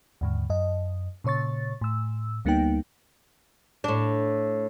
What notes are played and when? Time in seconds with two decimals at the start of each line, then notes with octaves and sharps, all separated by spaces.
0.21 D#2 G#2 D3
0.50 F#2 D#5
1.24 A#2 C#3 C#5 C#6 A6
1.81 A2 E6
2.45 D2 G3 A#3 B3 D#4 G5
3.84 A2 D4